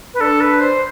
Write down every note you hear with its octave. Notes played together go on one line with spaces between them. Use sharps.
B4
D4 A4
B4
C5